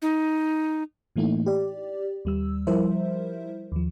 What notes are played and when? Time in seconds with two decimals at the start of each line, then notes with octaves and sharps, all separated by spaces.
0.02 D#4
1.16 A2 E3 A3 A#3 D#4 E4
1.46 G4 D5
2.25 D#2 G3 E6
2.67 F3 G3 E4 A#4 C5 E5
3.72 D#2 F3